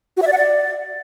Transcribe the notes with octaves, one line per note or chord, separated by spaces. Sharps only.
F#4
E5
D5
F#5
D5